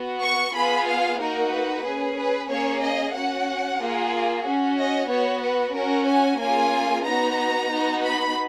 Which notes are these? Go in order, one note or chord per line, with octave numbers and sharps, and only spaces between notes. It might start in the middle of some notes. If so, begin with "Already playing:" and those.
Already playing: B3 F#4
C#6
B3 F4 G#4 B5
F5
A#3 D#4 F#4 A#4
B4
C#4 G#4
B4
A#3 C#4 G#4 C#5
D#5
C#4 F#4 F#5
A#3 F4 G#4
C#4 F#4
D#5
B3 F#4 C#5
B4
C#4 F#4 A#4
G#5
A#3 C#4 F4 G#4 G#5
B3 D#4 F#4 A#5
B3 D#4 F#4
B5